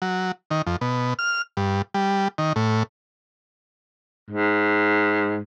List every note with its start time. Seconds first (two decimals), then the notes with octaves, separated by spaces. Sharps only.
0.02 F#3
0.51 D#3
0.66 F2
0.81 B2
1.19 F6
1.57 G2
1.94 G3
2.38 D#3
2.56 A2
4.31 G#2